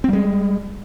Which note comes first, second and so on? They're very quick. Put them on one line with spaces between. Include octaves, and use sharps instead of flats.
C4 G3 G#3